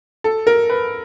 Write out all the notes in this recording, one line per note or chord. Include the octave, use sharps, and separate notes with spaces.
A4
A#4
B4